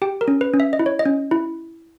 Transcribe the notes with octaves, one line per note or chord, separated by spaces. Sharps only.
G4 G5
A#4
C#4
B4
C#4
E5
D#5
E4
C#5
D#5
C#4
E4